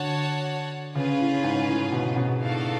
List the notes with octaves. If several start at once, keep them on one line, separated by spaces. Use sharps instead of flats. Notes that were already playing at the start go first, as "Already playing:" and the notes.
Already playing: D3 F#4 C#5 F#5 A5
C#3 C#4 F4 G#4 B4
A2
G#2
A2
B2
B2
A3 D4 F#4 A4 F5